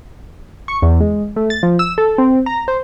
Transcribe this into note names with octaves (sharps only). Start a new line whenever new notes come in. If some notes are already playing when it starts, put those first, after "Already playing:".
C#6
E2
G#3
A3
A6
F3
E6
A4
C4
A#5
C5